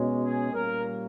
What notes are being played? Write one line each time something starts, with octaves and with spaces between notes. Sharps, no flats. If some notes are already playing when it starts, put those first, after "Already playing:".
Already playing: B2 G#3 C#4
G#4
A#2 G3 A#3 C#4 A#4